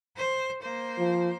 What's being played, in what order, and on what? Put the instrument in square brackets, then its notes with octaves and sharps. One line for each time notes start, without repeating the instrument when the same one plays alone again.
[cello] C5
A#3 C5
[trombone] F3